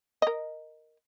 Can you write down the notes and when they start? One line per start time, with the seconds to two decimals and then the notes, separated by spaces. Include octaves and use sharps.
0.22 A#4 D#5